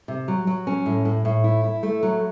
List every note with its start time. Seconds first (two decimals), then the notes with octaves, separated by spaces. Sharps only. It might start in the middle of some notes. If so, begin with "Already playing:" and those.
0.08 C3
0.28 F#3
0.47 F#3
0.67 C#4
0.86 A2
1.05 A2
1.25 A2
1.44 E4
1.64 E4
1.83 A3
2.03 F#3